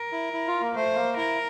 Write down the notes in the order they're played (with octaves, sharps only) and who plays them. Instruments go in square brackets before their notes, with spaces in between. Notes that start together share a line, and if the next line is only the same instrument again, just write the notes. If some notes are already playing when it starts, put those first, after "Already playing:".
Already playing: [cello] A#4
[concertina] E4
E4
F4
A#3
[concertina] A3 [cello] C5
[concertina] A#3
[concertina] E4 [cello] A#4